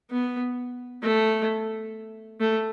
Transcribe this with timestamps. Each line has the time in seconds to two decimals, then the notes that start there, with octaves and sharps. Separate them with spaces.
0.10 B3
1.02 A3
2.40 A3